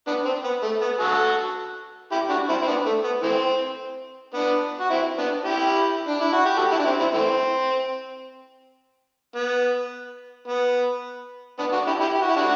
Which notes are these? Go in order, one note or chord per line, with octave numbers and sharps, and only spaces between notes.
B3 D4
C4
B3
A3
B3
F#4 A4
E4 G4
D4 F#4
C4 E4
C4
B3 D4
A3
B3
E3 A3 C4
B3 D4
F#4
C4 E4
B3 D4
E4 G4
D4
E4
F#4
G4
F#4 A4
E4 G4
D4
C4 E4
C4 E4
E3 A3 C4
B3
B3
B3 D4
D4 F#4
E4 G4
E4 G4
G4
F#4
E4
D4 F#4